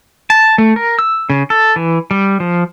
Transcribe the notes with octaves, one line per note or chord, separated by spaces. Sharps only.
A5
A3
A#4
E6
C#3
A4
E3
G3
F3